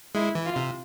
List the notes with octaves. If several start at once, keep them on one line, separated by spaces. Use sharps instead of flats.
G#3 E4
E3
F4
C3